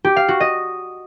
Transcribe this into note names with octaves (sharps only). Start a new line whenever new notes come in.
G4
F5
F#4
D#5